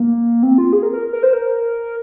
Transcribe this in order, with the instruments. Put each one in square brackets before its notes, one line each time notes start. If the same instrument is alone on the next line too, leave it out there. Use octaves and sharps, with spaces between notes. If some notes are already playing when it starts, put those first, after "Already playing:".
Already playing: [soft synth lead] A#3
C4
F4
G#4
A#4
A#4
A#4
C5
A#4